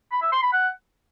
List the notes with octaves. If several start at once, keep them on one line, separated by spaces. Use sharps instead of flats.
B5
E5
C6
B5
F#5